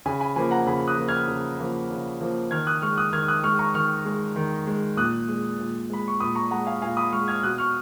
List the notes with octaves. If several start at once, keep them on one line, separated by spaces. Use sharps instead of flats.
C#3 G#5 B5
G#5 B5
F3 A#3 G#5 B5
F#5 A#5
C#3 G#5 B5
D#6 F#6
F3 A#3
F6 G#6
C#3
F3 A#3
C#3
F3 A#3
D#3 F6 G#6
D#6 F#6
G#3 C#6 F6
D#6 F#6
D#3 F6 G#6
D#6 F#6
G#3 C#6 F6
A#5 C#6
D#3 C#6 F6
G#3
D#3
G#3
A#2 D#6 F#6
G#3
A#2
G#3 B5
C#6
A#2 B5 D#6
A#5 C#6
G#3 F#5 A#5
F5 G#5
A#2 F5 G#5
B5 D#6
G#3 C#6 F6
F6 G#6
B2 D#6 F#6
C#6 F6